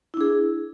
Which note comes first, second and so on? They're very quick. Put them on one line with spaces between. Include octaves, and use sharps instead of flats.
E4 D4 G#4